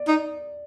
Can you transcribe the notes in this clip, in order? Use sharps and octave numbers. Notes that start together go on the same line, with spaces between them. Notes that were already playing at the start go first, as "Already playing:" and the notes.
Already playing: D5
D#4